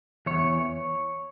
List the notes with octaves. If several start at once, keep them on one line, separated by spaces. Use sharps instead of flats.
E2 E3 C#5